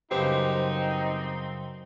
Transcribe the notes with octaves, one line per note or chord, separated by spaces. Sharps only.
F#2 C#3 G3 C4 D#4 G4 B4 C5